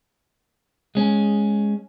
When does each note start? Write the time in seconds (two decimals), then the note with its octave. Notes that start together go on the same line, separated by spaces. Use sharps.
0.95 G#3 C#4